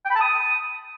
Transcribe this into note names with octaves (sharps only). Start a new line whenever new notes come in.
G5
B5
A5
D#6